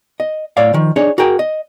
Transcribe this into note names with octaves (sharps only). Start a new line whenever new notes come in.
D#5
A2 C#5 D5 F5
D#3 F3
D4 D#4 G#4 C#5
F#4 G#4 A#4 G5
D#5